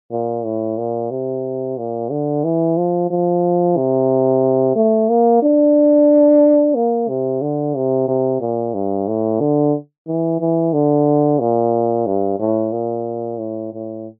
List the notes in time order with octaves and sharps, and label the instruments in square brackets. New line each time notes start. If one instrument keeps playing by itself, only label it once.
[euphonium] A#2
A2
A#2
C3
A#2
D3
E3
F3
F3
C3
A3
A#3
D4
A#3
C3
D3
C3
C3
A#2
G2
A2
D3
E3
E3
D3
A#2
G2
A2
A#2
A2
A2